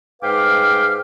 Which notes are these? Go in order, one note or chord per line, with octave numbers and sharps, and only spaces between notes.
G#2 B4 F5 G5 D6 F6